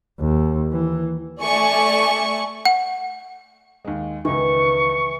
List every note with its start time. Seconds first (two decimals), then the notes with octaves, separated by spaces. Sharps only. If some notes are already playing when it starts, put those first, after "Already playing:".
0.20 D#2
0.72 E3
1.41 A3 D5 G#5 C#6
2.65 F#5
3.85 D#2 G#3
4.25 C#2 D#3 E3 C#6